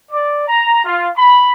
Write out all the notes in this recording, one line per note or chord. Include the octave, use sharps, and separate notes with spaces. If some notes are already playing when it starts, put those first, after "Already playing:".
D5
A#5
F4
B5